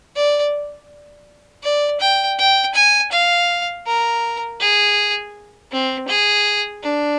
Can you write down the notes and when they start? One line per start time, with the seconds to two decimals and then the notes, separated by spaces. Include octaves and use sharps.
0.16 D5
1.63 D5
2.00 G5
2.39 G5
2.75 G#5
3.12 F5
3.86 A#4
4.60 G#4
5.72 C4
6.08 G#4
6.83 D4